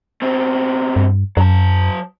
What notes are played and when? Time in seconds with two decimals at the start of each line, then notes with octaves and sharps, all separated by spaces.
0.22 B2 C4
0.96 G2
1.37 F#2 F#3 A5